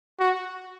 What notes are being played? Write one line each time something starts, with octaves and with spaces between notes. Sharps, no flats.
F#4